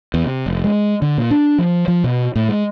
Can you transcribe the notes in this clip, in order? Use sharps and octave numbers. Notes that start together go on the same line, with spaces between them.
E2
C3
F1
G#3
D3
A#2
D4
F3
F3
B2
A2
G#3